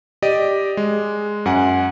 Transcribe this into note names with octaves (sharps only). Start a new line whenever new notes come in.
G4 D5 D#5 D#7
G#3
F#2 F#5 G#5